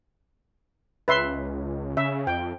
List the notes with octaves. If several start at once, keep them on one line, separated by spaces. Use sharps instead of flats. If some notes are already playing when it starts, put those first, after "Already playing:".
C#2 B4 E5 C6
C#3 E5
F2 G5